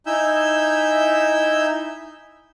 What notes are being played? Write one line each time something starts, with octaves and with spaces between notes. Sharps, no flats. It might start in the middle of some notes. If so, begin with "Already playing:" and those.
D#4 E4 E5 G#5 E6 G6